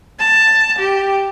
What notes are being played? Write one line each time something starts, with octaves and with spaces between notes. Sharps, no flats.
A5
G4